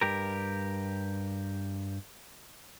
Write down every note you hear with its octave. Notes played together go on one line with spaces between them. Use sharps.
G2 G4 A#4